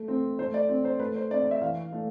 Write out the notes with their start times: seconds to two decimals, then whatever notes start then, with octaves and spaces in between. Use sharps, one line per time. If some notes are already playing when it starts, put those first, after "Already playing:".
Already playing: A3
0.08 C4
0.39 A3 C5
0.54 D5
0.69 C4
0.85 C5
0.99 A3 B4
1.16 C5
1.31 C4 D5
1.42 D5
1.51 E5
1.61 E3 F5
1.93 A3